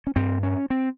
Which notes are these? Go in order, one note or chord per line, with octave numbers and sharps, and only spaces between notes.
C#4
G2 C4
C#4
C4